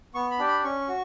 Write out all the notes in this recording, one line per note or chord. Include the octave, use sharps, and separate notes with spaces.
B3 C#6
B5
D4 G4
B5
C#4 C#6
F#4